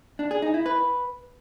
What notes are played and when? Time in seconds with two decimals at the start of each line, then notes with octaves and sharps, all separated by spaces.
0.19 D4
0.31 G#4
0.42 D#4
0.54 E4
0.66 B4